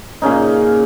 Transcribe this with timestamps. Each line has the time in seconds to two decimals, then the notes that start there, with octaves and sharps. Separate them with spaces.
0.22 A#2 C#3 C#4 D#4